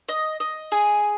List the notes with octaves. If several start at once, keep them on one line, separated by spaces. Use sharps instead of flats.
D#5
D#5
G#4